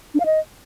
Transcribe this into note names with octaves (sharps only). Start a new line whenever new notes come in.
D4
F5
D#5